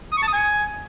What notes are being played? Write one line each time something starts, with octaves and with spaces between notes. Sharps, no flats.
D#6
C#6
A5
D#6
G#5